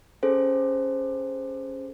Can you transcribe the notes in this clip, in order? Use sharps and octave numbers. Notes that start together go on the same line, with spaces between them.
C#4 G#4 A4 C5